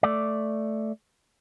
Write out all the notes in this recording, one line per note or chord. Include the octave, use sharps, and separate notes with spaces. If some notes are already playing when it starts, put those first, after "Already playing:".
A3 D5